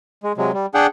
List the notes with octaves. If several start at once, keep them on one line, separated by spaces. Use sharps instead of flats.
G#3
C3 F#3 G#3
G3
D4 G#4 F#5 G5